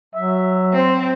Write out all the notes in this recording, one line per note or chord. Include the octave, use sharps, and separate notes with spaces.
F#3 E5
C4 C5